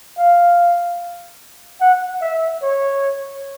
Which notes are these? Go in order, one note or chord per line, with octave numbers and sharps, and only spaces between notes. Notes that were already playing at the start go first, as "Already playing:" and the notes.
F5
F#5
E5
C#5